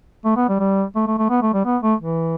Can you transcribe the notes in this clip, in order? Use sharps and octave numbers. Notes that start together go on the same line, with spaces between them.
A3
B3
G3
G3
A3
A3
A3
B3
A3
G3
B3
A3
E3